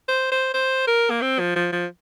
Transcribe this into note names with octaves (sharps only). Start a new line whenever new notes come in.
C5
C5
C5
A#4
A#3
C4
F3
F3
F3